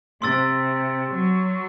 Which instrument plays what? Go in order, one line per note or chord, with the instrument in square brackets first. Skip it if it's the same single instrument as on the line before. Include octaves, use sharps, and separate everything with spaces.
[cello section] C3 [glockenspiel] C6 E6 A6
[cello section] F#3